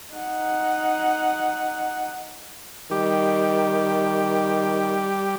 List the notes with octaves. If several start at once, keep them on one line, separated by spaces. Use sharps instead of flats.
D#4 F#5
D#3 G3 G4